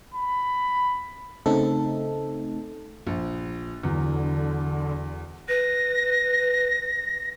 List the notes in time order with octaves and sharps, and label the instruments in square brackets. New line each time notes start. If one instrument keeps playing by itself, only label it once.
[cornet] B5
[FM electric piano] C#3 A3 C4 D#4 A4
[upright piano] A#1
[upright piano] E2 F#3 [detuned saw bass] D3
[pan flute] B4 [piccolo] A#6